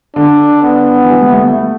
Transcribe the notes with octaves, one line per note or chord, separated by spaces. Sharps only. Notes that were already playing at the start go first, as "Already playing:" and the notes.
D3 D4
B3
E3
G3
A3
A3
A3